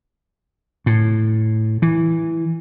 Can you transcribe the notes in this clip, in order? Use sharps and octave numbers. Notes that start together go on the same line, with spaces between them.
A2
E3